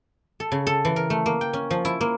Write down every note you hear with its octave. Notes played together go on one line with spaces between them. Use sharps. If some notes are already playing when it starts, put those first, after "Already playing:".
A4
C#3
A4
E3
A#4
A3
A#3
G5
C#4
F3
E4
A#3